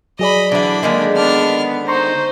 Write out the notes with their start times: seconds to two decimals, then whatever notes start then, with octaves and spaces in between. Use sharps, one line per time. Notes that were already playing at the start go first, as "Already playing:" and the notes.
0.19 F#3 G#4 D5 D#5 B5
0.52 D3 E3 D4 B5
0.83 D3 D#3 G#3 A#3
1.16 B3 D4 F6
1.88 D#4 C5 A#5 C6 C#6